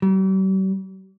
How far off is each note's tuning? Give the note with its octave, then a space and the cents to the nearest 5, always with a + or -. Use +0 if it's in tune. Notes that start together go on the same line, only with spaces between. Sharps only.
G3 -45